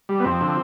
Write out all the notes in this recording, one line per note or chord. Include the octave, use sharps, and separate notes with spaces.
G3
B3
F2 C4
D3 F3